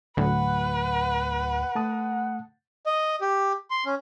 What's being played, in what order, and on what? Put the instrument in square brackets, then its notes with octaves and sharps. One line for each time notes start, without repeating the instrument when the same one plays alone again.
[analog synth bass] D2 [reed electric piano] A2 F#3 [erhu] B4 [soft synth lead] F#5
[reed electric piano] A3 A5 D#6
[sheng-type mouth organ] D#5
G4
C6
C#4